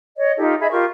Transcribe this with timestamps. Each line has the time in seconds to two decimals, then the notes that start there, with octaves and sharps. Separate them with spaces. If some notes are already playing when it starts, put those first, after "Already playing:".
0.16 C#5 D#5
0.37 D#4 F4 G4 A4
0.60 G#4 D#5 E5 B5
0.71 F4 G4 A#4 C#6